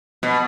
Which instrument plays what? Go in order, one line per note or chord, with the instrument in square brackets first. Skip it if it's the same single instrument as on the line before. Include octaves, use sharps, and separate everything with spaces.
[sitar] B2